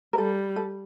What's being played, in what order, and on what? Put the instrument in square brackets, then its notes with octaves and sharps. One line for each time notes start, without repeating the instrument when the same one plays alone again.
[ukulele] A#4
[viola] G3 [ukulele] A4
[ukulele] A4